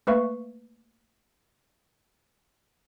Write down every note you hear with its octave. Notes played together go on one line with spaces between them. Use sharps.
A3 A#3 B4 E5 F5 C#6